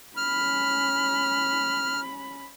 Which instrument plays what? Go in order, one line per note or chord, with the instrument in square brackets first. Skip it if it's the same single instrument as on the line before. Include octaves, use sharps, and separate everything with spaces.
[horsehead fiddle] C#4 B5 [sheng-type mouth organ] F6